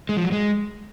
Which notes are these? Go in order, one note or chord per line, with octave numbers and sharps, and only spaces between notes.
G#3
F3
F#3
G#3